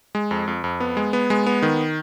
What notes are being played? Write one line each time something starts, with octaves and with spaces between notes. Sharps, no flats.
G#3
F2
F2
F2
B3
G#3
B3
G#3
B3
D#3